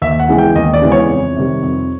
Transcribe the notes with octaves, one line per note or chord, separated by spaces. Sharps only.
D#2 E5
F#5
C#3 E3 G#3 B3
G5
D#2 D#5
D5
C#3 E3 G#3 B3
C#5
F2
C3 D#3 G3
F2